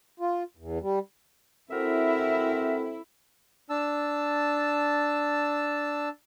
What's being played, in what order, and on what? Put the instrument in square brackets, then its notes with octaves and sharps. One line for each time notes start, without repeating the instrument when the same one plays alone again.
[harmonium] F4
E2
G3
[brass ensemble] C4 A4 [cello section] E4 [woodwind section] F#4 A#4 E5
[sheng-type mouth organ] D4 A5 E6